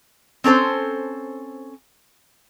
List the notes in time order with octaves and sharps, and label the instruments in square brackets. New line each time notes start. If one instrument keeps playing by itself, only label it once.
[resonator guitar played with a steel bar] C4 C#4 A4 C5